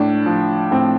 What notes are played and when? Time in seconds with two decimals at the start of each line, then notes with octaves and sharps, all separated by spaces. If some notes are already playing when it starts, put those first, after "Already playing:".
Already playing: A2 D4
0.26 F3
0.71 A2 C4